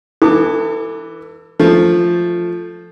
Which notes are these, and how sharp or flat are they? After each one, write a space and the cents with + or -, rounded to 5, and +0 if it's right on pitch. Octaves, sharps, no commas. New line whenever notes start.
E3 +0 A4 +35 D6 +0
F3 +0 A3 +0